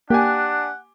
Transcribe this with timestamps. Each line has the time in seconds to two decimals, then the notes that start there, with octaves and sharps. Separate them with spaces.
0.10 A#3 D4 G4 F#5 G#5